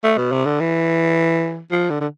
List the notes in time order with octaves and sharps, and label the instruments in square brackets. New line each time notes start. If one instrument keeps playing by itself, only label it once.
[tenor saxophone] A3
B2
C3
D3
E3
F3
D3
D3